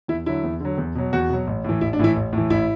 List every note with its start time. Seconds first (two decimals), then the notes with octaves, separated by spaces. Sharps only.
0.08 E2 E4
0.26 D3 F#3 E4
0.44 E2
0.60 D3 F#3
0.78 E2
0.95 B2 F#3
1.13 E2 F#4
1.29 B2 F#3
1.47 A1
1.64 A2 E3
1.81 A1 E4
1.93 D4
1.99 A2 E3 E4
2.16 A1
2.33 A2 E3
2.50 A1 E4